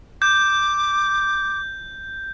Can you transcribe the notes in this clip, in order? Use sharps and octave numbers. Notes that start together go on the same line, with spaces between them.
D6 G6